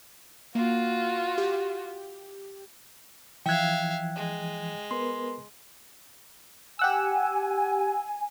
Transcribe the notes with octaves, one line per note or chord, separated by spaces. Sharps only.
A#3 F4 F#4
G4
E3 F3 E5 F5 G5 F#6 G#6
G#3
B3 A#4 B4 C6
G4 F#5 G#5 E6